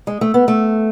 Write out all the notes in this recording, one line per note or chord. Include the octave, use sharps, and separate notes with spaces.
G#3
A3
B3
A3